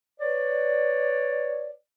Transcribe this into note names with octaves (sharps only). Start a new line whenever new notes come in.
B4 C#5 D5